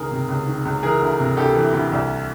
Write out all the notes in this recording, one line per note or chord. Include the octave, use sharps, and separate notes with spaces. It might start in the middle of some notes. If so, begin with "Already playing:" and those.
Already playing: C#2 D#3 G#4 A#4
C3
C#2
D#3
C#2
E3 G#4 A#4
D2
C3
D2 G4 A4
E3
D2
C2